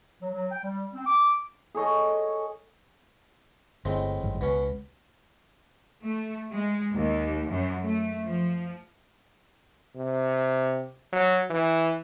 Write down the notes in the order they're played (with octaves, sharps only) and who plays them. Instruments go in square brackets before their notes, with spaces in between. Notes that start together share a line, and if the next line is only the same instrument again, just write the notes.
[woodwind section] F#3
F#3
G5
G3
C4
D6
[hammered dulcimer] G#4 A4 C#5 D#5
[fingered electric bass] G1 [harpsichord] A2 G#3 C4
[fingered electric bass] G#1 G2
[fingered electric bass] C#2 [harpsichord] B2 C#4
[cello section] A3
G#3
D#2
F#2
A3
F3
[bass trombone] C3
F#3
E3